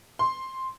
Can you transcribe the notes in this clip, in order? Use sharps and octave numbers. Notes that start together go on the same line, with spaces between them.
C6